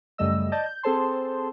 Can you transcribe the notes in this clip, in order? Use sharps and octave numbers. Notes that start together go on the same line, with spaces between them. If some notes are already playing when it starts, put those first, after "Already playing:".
F#2 C#3 G3 A3 D#5 E6
D5 D#5 A5 G6 A6
G6
C4 G#4 A4 C5 A5 C6